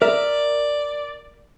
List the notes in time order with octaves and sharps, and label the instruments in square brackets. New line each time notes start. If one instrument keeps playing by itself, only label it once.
[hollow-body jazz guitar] A#4 E5 [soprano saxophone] D5